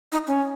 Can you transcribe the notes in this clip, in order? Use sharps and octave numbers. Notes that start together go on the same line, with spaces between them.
D#4
C#4